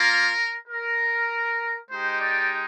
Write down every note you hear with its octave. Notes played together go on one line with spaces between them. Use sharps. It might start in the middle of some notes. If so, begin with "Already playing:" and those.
Already playing: A#3 F4 A#4
A#4
G#3 D#4 G4 C5
D5